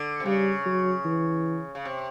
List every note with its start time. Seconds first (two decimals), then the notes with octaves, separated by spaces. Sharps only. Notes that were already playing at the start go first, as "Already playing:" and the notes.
Already playing: D3
0.20 C3
0.25 C#3 G3
0.65 F#3
1.05 E3
1.75 C#3
1.85 C3